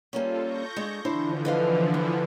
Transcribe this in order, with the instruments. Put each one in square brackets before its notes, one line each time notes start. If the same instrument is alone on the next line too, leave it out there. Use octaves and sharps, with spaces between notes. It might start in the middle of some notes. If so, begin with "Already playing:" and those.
[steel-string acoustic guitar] G3 A#3 C#4 [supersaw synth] F4 A4
[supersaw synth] C#6 G6 A#6
[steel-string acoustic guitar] G#3 D4
[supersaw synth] D3 E3 F3 [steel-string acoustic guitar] D4 E4 C5
[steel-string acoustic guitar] B4 D#5 F5
B3